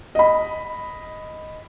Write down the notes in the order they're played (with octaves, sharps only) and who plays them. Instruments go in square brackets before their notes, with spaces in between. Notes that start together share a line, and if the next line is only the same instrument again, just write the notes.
[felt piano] D#5 B5